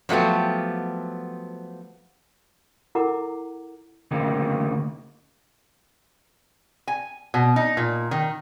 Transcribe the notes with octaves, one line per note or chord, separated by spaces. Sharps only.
F3 F#3 A3 B3 G4
E4 A4 A#4 F#5 A#5 D6
D2 C#3 A#3 D#4 G4
G#5
B2
D#4
A#2
D#3